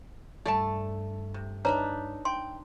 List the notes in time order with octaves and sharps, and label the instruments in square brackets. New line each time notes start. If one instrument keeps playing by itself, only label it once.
[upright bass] G2 [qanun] A3 [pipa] D5 E5 A5
[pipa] C3
[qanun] D4 D#4 E5 [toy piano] B4 C#5 A#5
[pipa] G5 [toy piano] C6